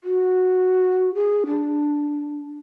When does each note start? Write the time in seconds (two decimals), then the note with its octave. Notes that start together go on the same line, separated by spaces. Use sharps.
0.04 F#4
1.15 G#4
1.47 D4